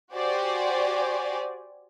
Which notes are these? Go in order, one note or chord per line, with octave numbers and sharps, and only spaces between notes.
F#4 G4 C5 D5 G#5